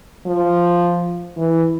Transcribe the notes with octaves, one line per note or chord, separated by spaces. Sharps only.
F3
E3